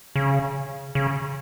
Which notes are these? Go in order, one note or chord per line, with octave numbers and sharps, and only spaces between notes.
C#3
C#3